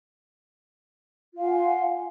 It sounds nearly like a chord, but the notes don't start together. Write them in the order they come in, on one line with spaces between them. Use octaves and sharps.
F4 F5 G#5 F#5